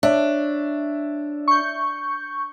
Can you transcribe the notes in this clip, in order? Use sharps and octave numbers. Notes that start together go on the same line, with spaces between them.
D4 C#5 E5
C#6 G6